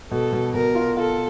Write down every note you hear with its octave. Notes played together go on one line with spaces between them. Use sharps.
B2 A4
B2
B2 A#4
F4
F4 A4